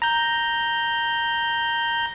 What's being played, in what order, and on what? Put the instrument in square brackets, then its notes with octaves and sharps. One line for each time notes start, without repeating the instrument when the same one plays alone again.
[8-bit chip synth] A#5 G6